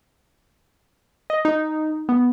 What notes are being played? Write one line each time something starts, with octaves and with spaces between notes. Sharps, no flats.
D#5
D#4
B3